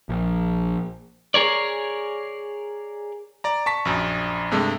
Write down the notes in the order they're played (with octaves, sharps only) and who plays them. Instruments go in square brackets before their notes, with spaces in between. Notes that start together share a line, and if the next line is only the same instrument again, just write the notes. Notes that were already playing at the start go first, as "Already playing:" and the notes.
[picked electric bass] A#1
[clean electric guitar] G#4 A#4 C#5 D5
[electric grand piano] D5 A#5
A5 C#6 B6
A#1 F#2
G2 C3 G#3 A3